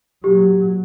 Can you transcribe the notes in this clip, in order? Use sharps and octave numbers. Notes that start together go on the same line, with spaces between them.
A#2 F#3 G4